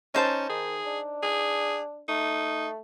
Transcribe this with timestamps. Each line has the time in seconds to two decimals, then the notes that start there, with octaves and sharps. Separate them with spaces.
0.15 C#4 D#4 C5 A5
0.49 D#3 G#4
0.86 D4
1.23 G#4
2.08 A3 D#4